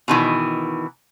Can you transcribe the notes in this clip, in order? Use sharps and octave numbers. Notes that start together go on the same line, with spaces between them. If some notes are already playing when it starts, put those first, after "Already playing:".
B2 D#3 E3